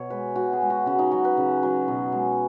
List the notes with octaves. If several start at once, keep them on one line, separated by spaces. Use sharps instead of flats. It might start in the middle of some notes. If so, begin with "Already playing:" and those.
Already playing: B2 C#5
G#3 B4
B2 F#4
G#4
G#3
F#4
C#3 F#4
D#4
F#3 F#4
B4
C#3
F#3
B2
G#3